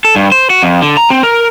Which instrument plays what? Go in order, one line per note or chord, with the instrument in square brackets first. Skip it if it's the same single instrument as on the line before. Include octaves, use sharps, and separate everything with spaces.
[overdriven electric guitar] A4
G2
C5
F#4
F2
D3
A#5
C4
A#4